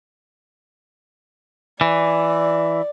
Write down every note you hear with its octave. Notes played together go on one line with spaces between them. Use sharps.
E3 D5